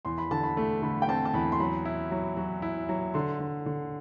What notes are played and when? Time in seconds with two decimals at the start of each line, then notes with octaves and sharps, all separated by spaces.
0.05 E2 C6
0.18 B5
0.31 D3 A5
0.43 B5
0.57 A3
0.82 D3 B5
1.02 G5
1.08 C4 A5
1.25 A5
1.34 E2 B5
1.52 C6
1.60 F#3 B5
1.85 E4
2.11 F#3
2.37 F#3
2.62 E4
2.89 F#3
3.14 D3 C6
3.40 D3
3.66 D3